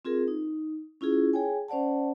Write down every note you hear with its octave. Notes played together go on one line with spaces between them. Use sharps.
C4 F4 G#4 A#4
D#4
C#4 E4 F4 G#4
G#4 C#5 G5 G#5
C#4 C5 D5 F#5 A5